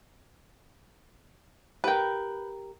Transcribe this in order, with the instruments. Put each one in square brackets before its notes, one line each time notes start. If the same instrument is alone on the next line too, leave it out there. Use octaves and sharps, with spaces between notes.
[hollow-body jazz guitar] G4 A#4 [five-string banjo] B4 G5